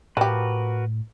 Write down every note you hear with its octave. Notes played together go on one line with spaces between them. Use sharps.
A2 F3 F#4 G4 A#4 B4